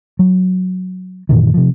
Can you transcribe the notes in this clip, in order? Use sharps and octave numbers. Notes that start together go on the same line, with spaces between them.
F#3
F#2 A#2 D#3 E3
C3 F3